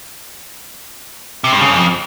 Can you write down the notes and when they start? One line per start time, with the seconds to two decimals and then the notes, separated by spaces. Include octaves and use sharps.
1.44 C3
1.53 G2
1.61 C#3
1.69 F2